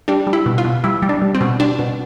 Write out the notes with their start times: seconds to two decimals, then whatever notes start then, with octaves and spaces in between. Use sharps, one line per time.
0.08 G3 D4
0.27 G3
0.33 E4
0.46 B2
0.58 F4
0.65 B2
0.84 G3 E4
1.02 G3
1.09 D4
1.22 G3
1.35 C4
1.41 B2
1.60 G3 D4
1.79 B2